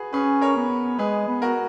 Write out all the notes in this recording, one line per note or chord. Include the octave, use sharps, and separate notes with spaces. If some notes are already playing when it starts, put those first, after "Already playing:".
Already playing: F#4 G#4 B4
C#4 G#4 B4
A#4 C#5
B3
G#3 G#4 B4
B3
F#4 A#4